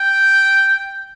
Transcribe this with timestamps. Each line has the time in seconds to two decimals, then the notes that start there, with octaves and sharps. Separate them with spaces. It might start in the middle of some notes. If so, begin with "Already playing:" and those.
Already playing: G5